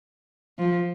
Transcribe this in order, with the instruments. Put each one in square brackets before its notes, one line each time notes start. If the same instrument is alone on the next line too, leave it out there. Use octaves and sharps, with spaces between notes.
[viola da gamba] F3